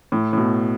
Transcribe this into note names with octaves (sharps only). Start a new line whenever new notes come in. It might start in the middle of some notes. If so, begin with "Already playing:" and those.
A2
A2
B2